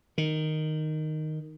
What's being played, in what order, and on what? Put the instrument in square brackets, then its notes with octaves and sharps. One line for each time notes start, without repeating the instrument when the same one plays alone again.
[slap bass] D#3